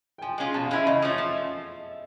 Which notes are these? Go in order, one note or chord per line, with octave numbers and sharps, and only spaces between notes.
G5
F3 G#5
G#3 C#4 F4
B2 A5
F5
G#3 C#4 E4 E5
C#3 D#5
F3 A3 C#4 E5
F3